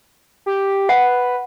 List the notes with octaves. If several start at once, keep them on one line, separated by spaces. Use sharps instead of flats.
G4
B4 F#5